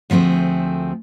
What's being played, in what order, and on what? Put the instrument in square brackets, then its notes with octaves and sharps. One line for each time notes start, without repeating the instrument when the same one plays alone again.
[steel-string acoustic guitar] D2 F3 A3 C4 G#4